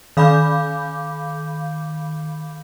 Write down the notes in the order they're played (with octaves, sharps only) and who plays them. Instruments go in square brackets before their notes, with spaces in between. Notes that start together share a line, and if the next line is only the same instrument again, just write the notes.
[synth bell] D#3 F5 B5 D6 G6